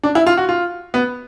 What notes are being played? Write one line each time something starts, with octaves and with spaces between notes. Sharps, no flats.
D4
E4
F4
F#4
F4
B3